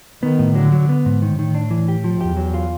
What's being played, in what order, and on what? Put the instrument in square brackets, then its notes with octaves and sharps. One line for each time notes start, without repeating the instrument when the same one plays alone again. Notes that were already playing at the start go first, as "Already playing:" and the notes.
[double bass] D#3 [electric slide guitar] B3
[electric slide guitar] A2
[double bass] D3 [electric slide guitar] F#3
[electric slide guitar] F#3
B3
G#2
[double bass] A2 [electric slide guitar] D#3
[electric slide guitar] D#3
D4
E3
G4
F3
[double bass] E2 [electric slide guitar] G4
[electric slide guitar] F#3
F4